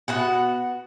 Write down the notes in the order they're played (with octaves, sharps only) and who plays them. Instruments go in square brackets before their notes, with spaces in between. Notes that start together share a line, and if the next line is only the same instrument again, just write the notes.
[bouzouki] B3 F#4 F#5